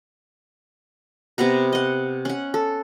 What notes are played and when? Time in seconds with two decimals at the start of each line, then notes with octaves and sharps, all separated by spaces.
1.38 C3 B3 F#5 A#5
1.73 D#5 F#5
2.25 C#4 F#5
2.54 A4